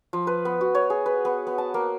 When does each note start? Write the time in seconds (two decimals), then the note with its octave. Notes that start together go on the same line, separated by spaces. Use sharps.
0.13 F3
0.27 B4
0.45 B3
0.61 F#4
0.75 C#5
0.90 G#4
1.06 B4
1.25 B3
1.47 B3
1.58 A5
1.74 A#3